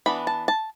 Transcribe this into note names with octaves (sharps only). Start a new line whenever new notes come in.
E3 B3 D4 B5
A5
A5